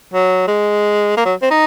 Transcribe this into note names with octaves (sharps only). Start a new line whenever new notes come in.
F#3
G#3
A#3
F#3
C4
D#4